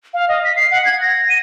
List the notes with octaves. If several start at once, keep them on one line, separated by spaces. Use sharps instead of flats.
F5
D#5
B6
C7
F#5
G#6
A#6
D#7